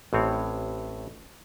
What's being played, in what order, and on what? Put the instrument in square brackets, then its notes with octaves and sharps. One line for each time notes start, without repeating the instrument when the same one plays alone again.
[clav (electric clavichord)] A1 A2 C4 C#5